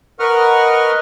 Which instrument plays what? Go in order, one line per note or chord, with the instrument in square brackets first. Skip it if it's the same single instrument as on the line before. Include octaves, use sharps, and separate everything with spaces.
[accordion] A#4 B4 D#5 F#5 C#6 F6